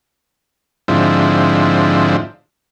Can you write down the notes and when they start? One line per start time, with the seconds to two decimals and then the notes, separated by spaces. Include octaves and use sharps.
0.88 G#2 D3 F3 C4 E4